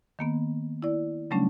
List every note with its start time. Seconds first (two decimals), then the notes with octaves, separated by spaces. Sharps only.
0.19 D#3 A#3 B3
0.83 E4 D5
1.31 C#3 F#3 G3 A3 C#4 D4